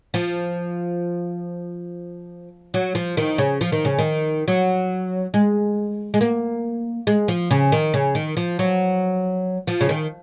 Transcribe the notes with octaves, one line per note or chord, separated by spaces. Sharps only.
F3
F#3
F3
D#3
C#3
F3
D#3
C#3
D#3
F#3
G#3
G#3
A#3
G#3
F3
C#3
D#3
C#3
D#3
F3
F#3
F3
C#3
D#3